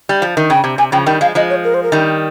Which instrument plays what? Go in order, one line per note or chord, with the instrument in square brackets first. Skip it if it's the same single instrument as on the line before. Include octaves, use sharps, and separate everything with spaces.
[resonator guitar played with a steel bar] G3
F3
D#3
[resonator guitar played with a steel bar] C#3 [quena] G5
[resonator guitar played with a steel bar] C3
[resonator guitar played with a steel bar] C3 [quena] G#5
[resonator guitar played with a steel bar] C#3 F3 [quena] G5
[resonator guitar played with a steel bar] D#3 G3 [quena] G5
[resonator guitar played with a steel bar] F3 G#3 [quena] F5
[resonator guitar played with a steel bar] F3 G#3 [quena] D#5
[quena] C#5
A#4
C5
A#4
[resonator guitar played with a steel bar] D#3 G3